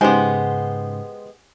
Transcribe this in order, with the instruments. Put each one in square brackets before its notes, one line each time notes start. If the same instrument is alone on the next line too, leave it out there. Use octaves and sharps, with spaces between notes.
[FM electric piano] G#2 C#3 [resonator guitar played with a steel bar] G#3 B3 [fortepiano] G4 C5 C6 [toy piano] G#5